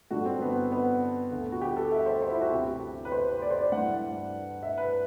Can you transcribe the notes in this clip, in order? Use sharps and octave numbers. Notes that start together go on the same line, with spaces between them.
G2 D3 F#4
C4
B3
B3
D2 D3
F#4
G4
A4
E5
C5
C5
E4
F#4
D2 C3 E3 G4
B4
C5
D5
C5
D5
G2 E3 F#5
E5
B4